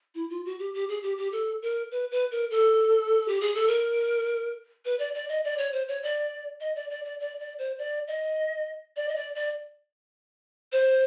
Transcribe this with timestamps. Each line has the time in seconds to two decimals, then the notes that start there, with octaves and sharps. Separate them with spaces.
0.15 E4
0.30 F4
0.45 F#4
0.59 G4
0.74 G4
0.89 G#4
1.03 G4
1.18 G4
1.32 A4
1.62 A#4
1.91 B4
2.11 B4
2.31 A#4
2.51 A4
3.28 G4
3.41 G#4
3.55 A4
3.68 A#4
4.85 B4
4.99 D5
5.15 D5
5.29 D#5
5.44 D5
5.58 C#5
5.73 C5
5.88 C#5
6.03 D5
6.61 D#5
6.75 D5
6.90 D5
7.05 D5
7.20 D5
7.40 D5
7.58 C5
7.79 D5
8.08 D#5
8.96 D5
9.08 D#5
9.16 D5
9.35 D5
10.72 C5